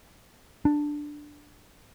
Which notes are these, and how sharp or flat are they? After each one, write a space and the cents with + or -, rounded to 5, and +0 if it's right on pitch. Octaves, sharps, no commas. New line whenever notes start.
D4 +5